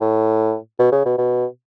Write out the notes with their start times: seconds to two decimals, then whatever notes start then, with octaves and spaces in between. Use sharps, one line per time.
0.01 A2
0.79 B2
0.92 C#3
1.05 B2
1.18 B2